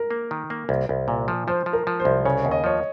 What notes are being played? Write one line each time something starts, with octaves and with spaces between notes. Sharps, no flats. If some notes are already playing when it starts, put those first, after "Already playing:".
Already playing: A#4
A#3
D#3
A#3
C2
C2
A#2
F3
F3 C5
F3
A#4
F3
C5
C2
C#3 C#5
D#2
D#5
F3 C#5